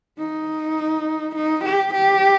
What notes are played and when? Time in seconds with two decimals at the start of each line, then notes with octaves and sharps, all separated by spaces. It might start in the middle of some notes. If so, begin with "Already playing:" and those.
0.18 D#4
1.35 D#4
1.64 G4
1.94 G4